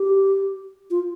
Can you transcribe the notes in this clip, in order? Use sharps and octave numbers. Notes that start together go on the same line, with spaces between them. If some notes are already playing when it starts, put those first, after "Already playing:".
Already playing: G4
F4